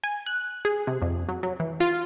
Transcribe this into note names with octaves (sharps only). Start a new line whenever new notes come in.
G#5
F#6
G#4
C3
F2
F#3
F#3
E3
F4